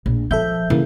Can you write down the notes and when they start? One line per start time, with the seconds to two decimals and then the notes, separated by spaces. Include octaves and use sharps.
0.06 A#1
0.31 F3 A4 E5 G6
0.70 C#3 E3 A#3